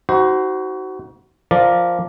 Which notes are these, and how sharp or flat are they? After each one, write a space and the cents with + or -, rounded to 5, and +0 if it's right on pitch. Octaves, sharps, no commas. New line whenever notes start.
D#4 +35 F#4 +25 C5 -10
F3 +0 A#4 +0 D5 +0